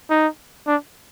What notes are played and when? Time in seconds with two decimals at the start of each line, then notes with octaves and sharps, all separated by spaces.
0.10 D#4
0.67 D4